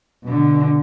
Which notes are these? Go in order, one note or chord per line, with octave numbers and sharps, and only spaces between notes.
B2 D3